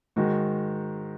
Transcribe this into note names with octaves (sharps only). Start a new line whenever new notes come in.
G#2 D#3 G#3 F#4